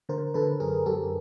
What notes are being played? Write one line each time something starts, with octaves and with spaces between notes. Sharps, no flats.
D3 A#4 C5
D3 A4 B4
F#2 G#4 A#4
F#2 G4 A4